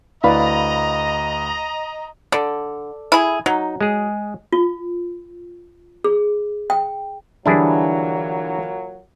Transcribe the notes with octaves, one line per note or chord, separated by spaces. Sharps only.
D2 E4 B4 D5 D#5 F5 A#5 B5
D3 A4 D5
E4 G#4
F#3 D#4
G#3 G#4
F4
G#4
G5
A#2 D3 E3 F#3 G3 D4 E4 G#4